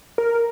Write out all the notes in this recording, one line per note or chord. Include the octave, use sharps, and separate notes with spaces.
A#4